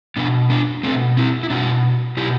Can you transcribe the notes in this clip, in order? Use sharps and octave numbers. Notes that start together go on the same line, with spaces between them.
B2 B3 D4
B3 D4
B2 A3 C4
C4 E4
E4
B2 D4 F#4
B2 E4 G4